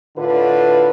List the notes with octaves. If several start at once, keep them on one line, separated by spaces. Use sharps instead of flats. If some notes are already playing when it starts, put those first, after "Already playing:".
A2 D3 F4 B4